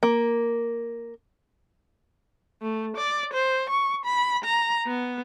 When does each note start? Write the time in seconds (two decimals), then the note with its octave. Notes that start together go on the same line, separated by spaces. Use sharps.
0.03 A#3
2.62 A3
2.97 D5
3.33 C5
3.70 C#6
4.05 B5
4.44 A#5
4.87 B3